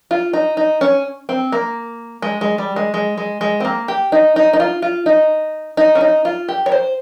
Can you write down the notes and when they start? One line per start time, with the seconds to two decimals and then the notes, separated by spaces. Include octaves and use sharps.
0.11 F4
0.33 D#4
0.57 D#4
0.81 C#4
1.29 C4
1.52 A#3
2.22 G#3
2.41 G#3
2.58 G3
2.76 G#3
2.94 G#3
3.17 G#3
3.41 G#3
3.60 C4
3.65 A#3
3.88 G4
4.12 D#4
4.36 D#4
4.53 D#4
4.60 F4
4.82 F4
5.06 D#4
5.77 D#4
5.95 C#4
6.01 D#4
6.25 F4
6.48 G4
6.66 C#5
6.72 C5